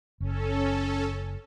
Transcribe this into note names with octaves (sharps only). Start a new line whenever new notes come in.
F#1 C#4 A4